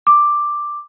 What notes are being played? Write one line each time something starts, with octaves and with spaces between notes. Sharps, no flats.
D6